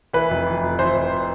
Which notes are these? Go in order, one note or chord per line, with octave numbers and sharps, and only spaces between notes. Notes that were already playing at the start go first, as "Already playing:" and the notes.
E3 B4
F1
E3
F1
E3 C5
F1